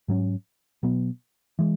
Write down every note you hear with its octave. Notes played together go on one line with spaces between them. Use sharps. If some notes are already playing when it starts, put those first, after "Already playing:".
G#2 F#3 C#4
B2 F#3 B3
E3 G#3